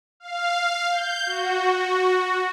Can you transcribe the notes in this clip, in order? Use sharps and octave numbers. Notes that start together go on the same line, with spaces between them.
F5
G6
F#4